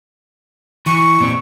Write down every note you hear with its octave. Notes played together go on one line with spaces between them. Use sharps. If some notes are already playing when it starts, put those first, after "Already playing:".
E3 C#6
A#2 C4